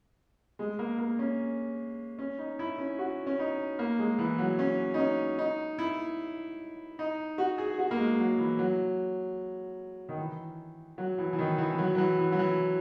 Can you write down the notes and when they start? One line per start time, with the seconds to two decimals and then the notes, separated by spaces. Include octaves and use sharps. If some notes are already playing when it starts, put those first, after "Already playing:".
0.59 G#3
0.79 A#3
0.98 A#3
1.19 C#4
2.19 C#4
2.38 D#4
2.59 E4
2.78 C#4
2.99 F#4
3.27 C#4
3.39 D#4
3.79 A#3
3.99 G#3
4.18 E3
4.38 F#3
4.59 C#4
4.94 D#4
4.98 C#4
5.39 D#4
5.78 E4
6.99 D#4
7.38 F#4
7.58 G#4
7.78 F#4
7.91 A#3
7.98 G#3
8.19 F#3
8.38 E3
8.59 F#3
10.09 D#3
10.19 E3
10.98 F#3
11.18 E3
11.33 E3
11.39 D#3
11.58 E3
11.73 E3
11.78 F#3
11.95 F#3
11.98 E3
12.18 E3
12.32 F#3
12.39 E3